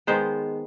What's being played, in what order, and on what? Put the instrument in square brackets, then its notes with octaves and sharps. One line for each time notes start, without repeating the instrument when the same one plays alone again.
[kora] D#3 G#3 B3 C5